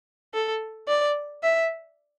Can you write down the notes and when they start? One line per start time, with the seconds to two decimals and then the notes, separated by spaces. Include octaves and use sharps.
0.34 A4
0.88 D5
1.43 E5